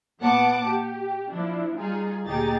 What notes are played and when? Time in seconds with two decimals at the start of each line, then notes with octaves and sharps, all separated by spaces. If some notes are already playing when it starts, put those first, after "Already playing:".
0.20 A#2 B3 F#5 A5 D6
0.66 G4
1.31 F3 D4 E4
1.77 G3 D#4 F4 G#4
2.25 D2 A#2 D#4 G4 G#4 A6